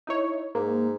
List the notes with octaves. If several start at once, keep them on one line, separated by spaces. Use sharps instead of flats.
D#4 E4 C#5
G#2 A#3